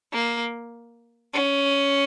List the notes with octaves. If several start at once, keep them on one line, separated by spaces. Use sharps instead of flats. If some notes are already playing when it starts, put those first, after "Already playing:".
A#3
C#4